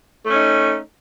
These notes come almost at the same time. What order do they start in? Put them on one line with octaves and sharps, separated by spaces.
A3 C#4 D#4